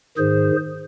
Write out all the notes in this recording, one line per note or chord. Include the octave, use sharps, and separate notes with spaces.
G#2 D#3 G#4 C5